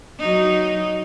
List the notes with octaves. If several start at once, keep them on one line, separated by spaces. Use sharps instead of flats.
F#3 D#4